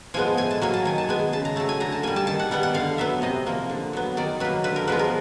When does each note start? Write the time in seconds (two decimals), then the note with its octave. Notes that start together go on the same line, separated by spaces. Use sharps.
0.14 F3 G#3 B3 G#5
0.37 A2 G#5
0.51 A5
0.61 F#3 A#3 G#5
0.74 A5
0.85 D#3 G#5
0.98 A5
1.09 G#3 B3 G#5
1.33 C#3 A5
1.45 A#5
1.56 F#3 A3 A5
1.69 G#5
1.80 D3 A#5
1.92 A5
2.03 G3 A#3 G#5
2.16 A5
2.27 D#3 A5
2.39 F#5
2.51 G3 B3 F#5
2.63 F#5
2.74 D3 F5
2.98 F#3 B3 E5
3.22 C3 D#5
3.47 F3 A#3
3.69 D3
3.93 F#3 B3
4.17 D#3 D5
4.40 F#3 A#3 B4
4.64 D3 B4
4.76 A#4
4.87 F3 G#3 B3 B4
4.99 A#4